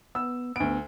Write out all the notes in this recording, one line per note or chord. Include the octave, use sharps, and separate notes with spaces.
B3 E6
D2 B3 D7